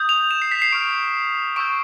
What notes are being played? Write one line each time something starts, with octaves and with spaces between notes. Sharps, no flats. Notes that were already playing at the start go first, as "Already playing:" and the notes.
Already playing: D#6 G6
F7
E7
C7
B6
C7
C#6 F6 D7
C#6 E6 G6 D7